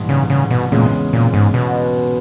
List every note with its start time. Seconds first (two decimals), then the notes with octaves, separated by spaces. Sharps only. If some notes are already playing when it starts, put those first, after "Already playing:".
Already playing: A#1 G#2 E3 G3
0.09 C#3
0.30 C#3
0.51 B2
0.72 E2 A#2 C#3 G#3
1.13 A#2
1.34 G#2
1.54 B2